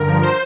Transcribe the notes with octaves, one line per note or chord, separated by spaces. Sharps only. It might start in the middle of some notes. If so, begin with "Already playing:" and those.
Already playing: G2 D3 A#4
F3
C5